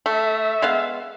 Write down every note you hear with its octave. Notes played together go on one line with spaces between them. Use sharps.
A3 E5
G#3 B3 F5